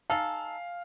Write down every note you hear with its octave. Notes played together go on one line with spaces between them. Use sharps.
D#4 A4 F5 G#5